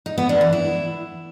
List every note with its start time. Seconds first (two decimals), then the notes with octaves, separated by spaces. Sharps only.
0.06 D#4
0.18 B3
0.29 D4
0.41 E3
0.53 E4